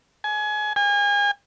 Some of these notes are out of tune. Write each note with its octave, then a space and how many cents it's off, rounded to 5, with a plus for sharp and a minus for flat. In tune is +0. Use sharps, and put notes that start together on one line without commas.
G#5 +25
G#5 -35